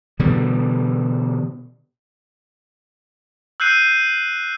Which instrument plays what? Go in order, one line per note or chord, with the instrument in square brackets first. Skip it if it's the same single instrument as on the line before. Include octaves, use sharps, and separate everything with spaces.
[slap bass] B2 D3 E3 G3
[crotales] E6 F#6 G6 C7 D#7